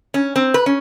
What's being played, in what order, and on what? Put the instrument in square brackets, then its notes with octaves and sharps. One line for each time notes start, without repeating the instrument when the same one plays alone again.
[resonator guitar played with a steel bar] C#4
C4
B4
C#4